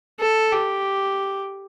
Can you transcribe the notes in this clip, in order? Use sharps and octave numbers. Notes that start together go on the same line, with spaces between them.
A4
G4